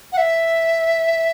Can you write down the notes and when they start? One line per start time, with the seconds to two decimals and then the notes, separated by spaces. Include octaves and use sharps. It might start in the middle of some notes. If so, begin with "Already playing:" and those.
0.13 F#5
0.17 E5